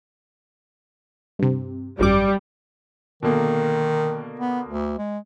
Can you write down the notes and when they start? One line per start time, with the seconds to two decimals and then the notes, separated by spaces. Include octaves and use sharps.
1.39 G2 C3
1.99 G#1 F#2 G3 D6
3.23 B2 D3 D#3 A#3
4.40 B3
4.68 D2
4.98 G#3